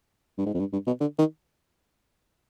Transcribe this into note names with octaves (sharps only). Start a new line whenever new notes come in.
G2
G#2
F2
G2
G2
B2
D3
D#3